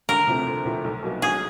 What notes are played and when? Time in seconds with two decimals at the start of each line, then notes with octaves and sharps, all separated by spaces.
0.09 D2 A#4
0.27 C3 F3 A3 C4
0.47 D2
0.65 C3 F3 A3 C4
0.84 B1
1.03 B2 F#3 A#3
1.21 B1 G#4